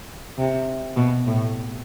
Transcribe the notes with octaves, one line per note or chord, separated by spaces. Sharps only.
C3
B2
A2